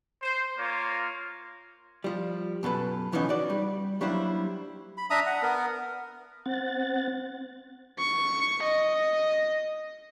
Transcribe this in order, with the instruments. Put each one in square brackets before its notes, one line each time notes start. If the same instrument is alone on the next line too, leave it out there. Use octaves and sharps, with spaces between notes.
[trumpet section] C5
A#3 F4 C#5
[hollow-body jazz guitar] F3 G3
F#2 B2 A4 B4
C#3 E3 F3 B3 C#4 D#4
F#4 D5
G3
F#3 G3 A#3 D4 E4 C5
[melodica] B5
D4 E5 A#5 D#6
F#5
B3 A#4
[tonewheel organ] C4 F#5 A6
[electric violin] C#6
D#5